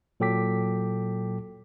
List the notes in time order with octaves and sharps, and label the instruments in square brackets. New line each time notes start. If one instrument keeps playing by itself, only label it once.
[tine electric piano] A#2 F#3 A4 G5 D6 B6